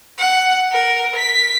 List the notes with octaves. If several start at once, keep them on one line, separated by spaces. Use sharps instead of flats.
F#5
A#4
B6